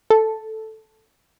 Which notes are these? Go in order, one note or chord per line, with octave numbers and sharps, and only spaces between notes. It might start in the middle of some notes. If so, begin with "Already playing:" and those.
A4